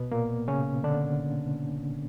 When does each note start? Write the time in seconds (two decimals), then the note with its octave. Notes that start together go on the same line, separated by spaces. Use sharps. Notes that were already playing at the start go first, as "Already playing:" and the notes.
Already playing: B2 B3
0.12 A#2 A#3
0.48 C#3 C#4
0.84 D3 D4